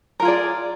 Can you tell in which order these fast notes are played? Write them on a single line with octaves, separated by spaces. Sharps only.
A#4 F4 G#4 D5